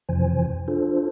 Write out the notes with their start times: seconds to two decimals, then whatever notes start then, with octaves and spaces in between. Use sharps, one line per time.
0.09 F2 C3 E3 F3 C5 G#5
0.68 D4 F4 A4 C5